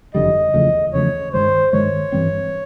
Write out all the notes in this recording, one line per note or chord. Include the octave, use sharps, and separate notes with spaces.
F#1 F2 D3 G3 D#5
E2 C#3 F3 A3
E2 C#3 F3 A3 C#5
G2 D#3 G#3 C5
G2 D#3 G#3 C#5
G2 E3 G3 C4